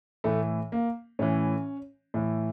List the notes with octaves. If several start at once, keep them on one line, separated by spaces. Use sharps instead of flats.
A2 E3 A3
A#3
A2 E3 C#4
A2 E3